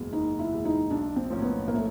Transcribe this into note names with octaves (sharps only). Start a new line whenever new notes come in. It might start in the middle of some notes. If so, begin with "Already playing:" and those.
Already playing: F#1 E2 B2 G#3
F#1 D#4
E4
E2 B2 G#3
D#4
B1 D4
C4
A2 F3 A#3 C#4
B3
A#3
A3